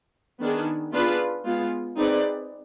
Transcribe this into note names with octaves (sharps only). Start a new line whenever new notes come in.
D#3 B3 D4 G#4
B3 D4 F4 G#4 B4
G#3 B3 F4 G#4
C4 D#4 G#4 B4 D5